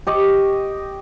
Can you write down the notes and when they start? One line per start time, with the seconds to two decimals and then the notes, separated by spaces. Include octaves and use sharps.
0.07 G4 D#5 C#6